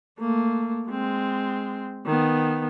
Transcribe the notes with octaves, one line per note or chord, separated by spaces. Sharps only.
A3 A#3
G#3 C4
D#3 B3